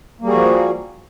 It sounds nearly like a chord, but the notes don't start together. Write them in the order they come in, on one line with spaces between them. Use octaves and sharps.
A#3 G3 G#4 F#4 F3